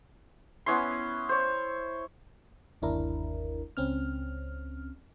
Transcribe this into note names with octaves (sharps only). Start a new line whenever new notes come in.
B3 C#4 E4 C6
C5 C#5
G1 D#2 D4 E4 A#4
C#2 C4 C#4 F6